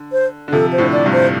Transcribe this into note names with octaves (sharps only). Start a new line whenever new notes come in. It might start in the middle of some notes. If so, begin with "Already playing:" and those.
Already playing: D3
C5
D3
C3 F3 A4
C5
A2 D3
D5
G2 C3
C5